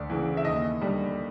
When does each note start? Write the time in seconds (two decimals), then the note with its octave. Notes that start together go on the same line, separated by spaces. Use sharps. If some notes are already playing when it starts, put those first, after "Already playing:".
Already playing: D2 D5
0.10 C#3 E3
0.37 E5
0.45 D#2 D#5
0.81 D3 G3